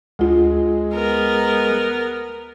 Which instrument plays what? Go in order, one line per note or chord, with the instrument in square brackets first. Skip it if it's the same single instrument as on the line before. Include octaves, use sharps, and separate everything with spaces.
[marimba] D2 F4 [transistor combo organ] G#3
[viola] B3 A#4